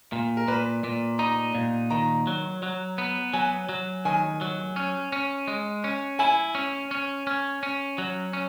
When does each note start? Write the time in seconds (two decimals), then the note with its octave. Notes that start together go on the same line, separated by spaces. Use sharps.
0.12 A#2
0.37 A#4
0.48 A#2 B4
0.84 A#2
1.19 D#4 A#5
1.55 A#2
1.90 D#3 A#5
2.27 F#3
2.63 F#3
2.98 B3
3.34 F#3 G#5
3.69 F#3
4.05 D#3 G#5
4.41 F#3
4.76 C#4
5.12 C#4
5.48 G#3
5.84 C#4
6.19 E4 G#5
6.55 C#4
6.91 C#4
7.27 C#4
7.63 C#4
7.98 F#3
8.33 C#4